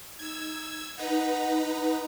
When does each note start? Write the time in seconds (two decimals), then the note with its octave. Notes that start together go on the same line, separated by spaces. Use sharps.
0.19 D#4 E6 G#6
0.98 D#4 B4 F#5 A#5